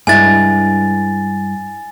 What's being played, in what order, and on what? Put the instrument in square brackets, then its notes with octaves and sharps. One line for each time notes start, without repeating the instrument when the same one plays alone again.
[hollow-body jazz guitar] G2 G#3 E4 [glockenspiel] G#5 A6